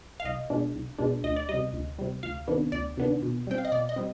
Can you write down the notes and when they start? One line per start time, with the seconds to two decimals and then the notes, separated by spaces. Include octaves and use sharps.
0.20 F5
0.25 C2 D#5
0.50 B2 G#3 D4
0.74 C2
0.98 B2 G#3 D4
1.24 D2 D#5
1.36 D5
1.49 C3 G3 D#5
1.73 D2
1.99 C3 G3
2.23 D2 F5
2.48 C3 D#3 B3 D4
2.72 D2 D5
2.97 C3 D#3 B3 D4
3.22 B2
3.47 G3 C4 G5
3.58 F5
3.65 D#5
3.72 B2 D5
3.89 D#5
3.96 G3 C4